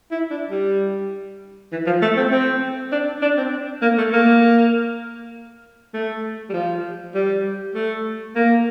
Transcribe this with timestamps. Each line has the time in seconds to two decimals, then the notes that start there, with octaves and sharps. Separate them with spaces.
0.12 E4
0.31 D4
0.51 G3
1.72 E3
1.86 F3
2.02 A3
2.17 C4
2.31 C4
2.92 D4
3.22 D4
3.38 C4
3.82 A#3
3.98 A3
4.14 A#3
5.94 A3
6.50 G3
6.54 F3
7.15 G3
7.75 A3
8.36 A#3